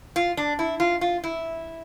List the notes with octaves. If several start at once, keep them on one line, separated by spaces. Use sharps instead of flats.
F4
D4
E4
F4
F4
E4